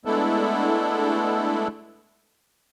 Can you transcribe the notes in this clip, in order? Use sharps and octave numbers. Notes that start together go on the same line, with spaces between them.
G#3 A3 B3 D4 E4 A4